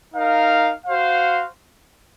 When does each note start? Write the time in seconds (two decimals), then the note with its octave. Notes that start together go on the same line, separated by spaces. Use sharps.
0.14 D#4 A#4 F5
0.85 F#4 C5 F5